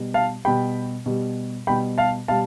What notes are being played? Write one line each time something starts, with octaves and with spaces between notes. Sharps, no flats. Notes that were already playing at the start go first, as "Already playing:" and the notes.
Already playing: B2 G3
F5 A5
B2 G3 G5 B5
B2 G3
B2 G3 G5 B5
F5 A5
B2 G3 F5 A5